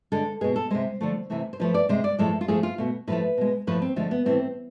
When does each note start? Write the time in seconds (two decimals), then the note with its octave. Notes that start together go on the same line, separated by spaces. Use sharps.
0.12 D3 G#3 A4
0.41 B2 G#3 G#4
0.56 A4
0.71 C3 G#3 C5
1.01 D3 F3 A3
1.30 C3 E3 A3
1.53 C5
1.59 D3 F3 A3 B4
1.74 D5
1.89 C3 G#3 C5
2.04 D5
2.19 A2 F3 G#3 A4
2.41 F4
2.48 A2 F3 A3 G#4
2.63 F4
2.78 B2 A3
3.07 A2 F3 A3 B4
3.38 B2 G#3
3.67 A2 F3 A3 B4
3.82 C4
3.96 D3 F3 G#3 A3
4.11 B3
4.26 A2 E3 A3 C4